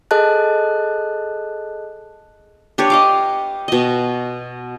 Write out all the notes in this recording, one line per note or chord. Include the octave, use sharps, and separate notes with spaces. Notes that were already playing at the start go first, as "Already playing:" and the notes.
G#4 A4 D#5 A5 F#6
D4 G4 B4 C#5
D#5 F5 D6
B2 D#5